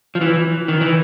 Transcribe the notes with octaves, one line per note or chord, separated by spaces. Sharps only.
F3
E3
D#3
E3